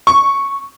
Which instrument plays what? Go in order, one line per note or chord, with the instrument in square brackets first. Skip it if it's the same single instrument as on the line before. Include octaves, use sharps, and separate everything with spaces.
[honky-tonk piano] C#6